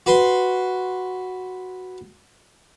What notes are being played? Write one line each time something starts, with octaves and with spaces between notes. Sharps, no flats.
F#4 B4 C6